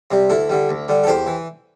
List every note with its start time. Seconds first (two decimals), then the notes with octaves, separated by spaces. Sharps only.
0.11 C3 G3
0.30 D2 E4 A4
0.49 D3 G3
0.69 D2
0.88 D3 G3
1.04 A4
1.07 E2 G4 C5
1.26 E3